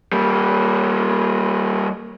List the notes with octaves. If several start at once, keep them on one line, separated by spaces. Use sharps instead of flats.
G3 A#3